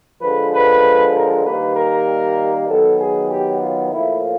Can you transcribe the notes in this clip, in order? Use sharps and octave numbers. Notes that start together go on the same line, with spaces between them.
D3 F3 G#3 B4
B4
A#4
D#3 G3 A#3 B4
A#4
D#3 F#3 B3 A4
G#4
G4
F4
A2 F3 A#3 E4